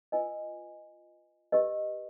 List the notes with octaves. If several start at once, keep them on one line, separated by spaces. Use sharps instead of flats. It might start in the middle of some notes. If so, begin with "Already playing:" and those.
F4 B4 D#5 G#5
G4 B4 D#5